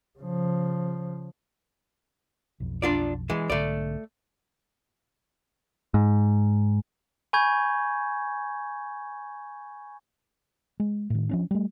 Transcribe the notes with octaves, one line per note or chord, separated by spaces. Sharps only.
C#3 F3
B1 F2
D4 F4 D5
E3 G#3
B1 G#2 D3 A3 D5
G#2
G#5 B5 C#6 G6 G#6
G#3
A2 D#3
F3 C#4 D4
G3 A3